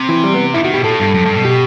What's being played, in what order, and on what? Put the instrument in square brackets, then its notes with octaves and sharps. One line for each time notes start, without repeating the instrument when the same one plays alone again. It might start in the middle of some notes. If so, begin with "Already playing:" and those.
Already playing: [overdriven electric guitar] C3
[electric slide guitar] E3
G3
B3
[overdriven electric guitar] D#3 [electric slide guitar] E4
[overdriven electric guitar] D#3 [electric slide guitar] F#4
[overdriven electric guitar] B2 [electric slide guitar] G4
[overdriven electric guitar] A2 [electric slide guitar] A4
[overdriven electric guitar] G2
F#2
G2
B2
[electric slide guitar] G4